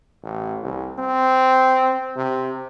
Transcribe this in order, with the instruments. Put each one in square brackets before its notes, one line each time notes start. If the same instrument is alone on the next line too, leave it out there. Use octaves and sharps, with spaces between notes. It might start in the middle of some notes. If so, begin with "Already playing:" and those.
[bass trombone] A1
C2
C4
C3